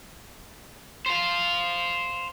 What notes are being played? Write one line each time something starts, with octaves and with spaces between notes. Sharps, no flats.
C5 F5